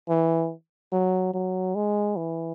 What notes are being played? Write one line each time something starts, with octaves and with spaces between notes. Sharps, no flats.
E3
F#3
F#3
G#3
E3